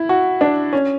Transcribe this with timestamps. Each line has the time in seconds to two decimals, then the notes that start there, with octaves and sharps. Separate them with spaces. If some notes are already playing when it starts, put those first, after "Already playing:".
Already playing: E4
0.09 F#4
0.41 D4
0.73 C#4